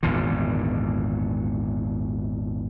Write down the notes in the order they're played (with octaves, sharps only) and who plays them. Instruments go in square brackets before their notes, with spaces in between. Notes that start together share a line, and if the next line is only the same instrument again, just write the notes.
[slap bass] G#1 E2 A#2 D3